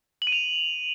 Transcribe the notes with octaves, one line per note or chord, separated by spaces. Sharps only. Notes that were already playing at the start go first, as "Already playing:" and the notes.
F#7
D#7
F7